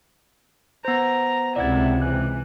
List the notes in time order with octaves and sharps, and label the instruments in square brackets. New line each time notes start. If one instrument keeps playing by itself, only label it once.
[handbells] B3 C5 [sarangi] A#5
[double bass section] C#2 C3 [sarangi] E4 [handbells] D5 F#5 G#6
[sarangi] E3 [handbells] F#6